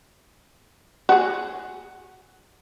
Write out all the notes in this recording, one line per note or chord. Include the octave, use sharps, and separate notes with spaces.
F#4 G#4